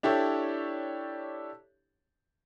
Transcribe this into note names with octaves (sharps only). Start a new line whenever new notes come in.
D4 E4 G4 A4 C#5